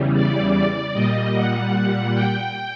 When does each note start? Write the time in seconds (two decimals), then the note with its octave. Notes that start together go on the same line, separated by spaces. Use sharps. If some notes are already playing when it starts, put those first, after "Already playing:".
Already playing: E2 C#3 E3 G3
0.13 D5
0.93 A#2 G3 D#5
1.34 F#5
2.14 G5